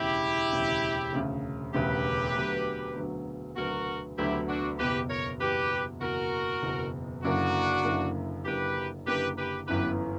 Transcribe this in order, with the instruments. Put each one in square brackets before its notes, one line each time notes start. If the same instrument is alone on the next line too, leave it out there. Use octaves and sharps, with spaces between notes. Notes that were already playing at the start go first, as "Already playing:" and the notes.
Already playing: [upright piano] E1 D2 C#3 [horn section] E4 G4
[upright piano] E1 D2 C#3
E1 D2 C#3
[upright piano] E1 D2 C#3 [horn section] G4 B4
[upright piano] D2 D3 F#3 B3
D2 D3 F#3 B3
[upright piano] D2 D3 F#3 B3 [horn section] F#4 A#4
[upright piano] D2 D3 F#3 B3 [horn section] E4 G4
[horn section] D4 F#4
[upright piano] F#1 E2 B2 [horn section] G4 B4
[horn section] A#4 C#5
[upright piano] F#1 E2 B2 [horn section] G4 B4
[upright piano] F#1 E2 B2 [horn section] F#4 A#4
[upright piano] F#1 E2 B2
[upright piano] F#1 F#2 D3 A#3 E4 [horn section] D4 F#4
[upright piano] F#1 F#2 D3 A#3 E4
[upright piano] F#1 F#2 D3 A#3 E4 [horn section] G4 B4
[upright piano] F#1 F#2 D3 A#3 E4 [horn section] G4 B4
[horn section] G4 B4
[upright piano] G1 F#2 E3 B3 E4 [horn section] G4 B4